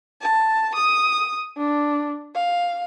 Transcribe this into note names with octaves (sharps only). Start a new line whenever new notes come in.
A5
D#6
D4
F5